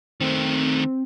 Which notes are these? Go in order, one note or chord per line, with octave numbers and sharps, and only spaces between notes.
D#3 A3 C4